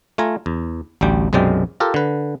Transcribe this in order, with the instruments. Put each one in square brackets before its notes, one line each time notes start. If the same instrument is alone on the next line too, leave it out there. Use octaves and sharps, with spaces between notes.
[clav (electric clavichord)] A3 F4 G#5 A#5
E2
A1 D2 G3 G5
B1 F#2 C3 G#3 D5 G5
F4 G4 A4 A#4
D3 B4